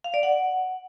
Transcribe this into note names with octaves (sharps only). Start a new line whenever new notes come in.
F5
D5
F#5